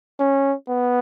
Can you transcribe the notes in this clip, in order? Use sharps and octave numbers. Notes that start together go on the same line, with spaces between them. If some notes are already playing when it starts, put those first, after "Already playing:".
C#4
B3